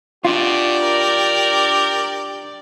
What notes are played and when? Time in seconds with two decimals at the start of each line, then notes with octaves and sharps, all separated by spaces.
0.25 B2 D4 F4 G4 D5
0.83 A#4